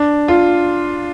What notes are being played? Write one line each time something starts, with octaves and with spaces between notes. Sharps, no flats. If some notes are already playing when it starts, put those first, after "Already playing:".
Already playing: D4
F4